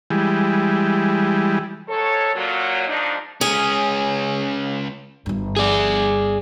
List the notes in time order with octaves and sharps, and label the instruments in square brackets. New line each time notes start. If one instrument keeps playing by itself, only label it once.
[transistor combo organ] E3 G3 G#3
[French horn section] G#2 A4 C#5
A#2 F#3
G#2 F3 D4 D#4
[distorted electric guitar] C#2 C#4 [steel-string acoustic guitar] G#4
[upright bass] G1 G2
[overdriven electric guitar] G#4 D5